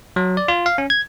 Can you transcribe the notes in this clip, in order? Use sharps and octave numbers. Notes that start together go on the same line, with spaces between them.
F#3
D5
F4
F5
C#4
G#6